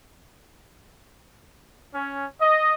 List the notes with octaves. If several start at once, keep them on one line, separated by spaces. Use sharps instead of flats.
C#4
D#5